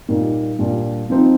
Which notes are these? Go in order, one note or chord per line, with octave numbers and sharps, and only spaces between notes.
A#2 G3 A#3 D#4
A#2 G3 D4
F3 C4 D#4